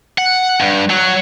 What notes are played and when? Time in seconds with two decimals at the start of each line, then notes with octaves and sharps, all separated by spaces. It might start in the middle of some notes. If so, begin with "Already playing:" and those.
0.18 F#5
0.60 G2
0.90 F#3